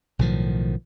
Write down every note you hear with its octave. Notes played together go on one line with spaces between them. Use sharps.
B1 A2 D#3 F3